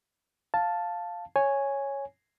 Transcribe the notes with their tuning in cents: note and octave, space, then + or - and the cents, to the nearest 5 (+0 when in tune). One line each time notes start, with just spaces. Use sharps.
F5 +0 A5 +0
C#5 -5 G#5 +0